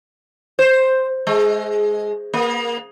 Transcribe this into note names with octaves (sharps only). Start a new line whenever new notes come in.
C5
G#3
A#3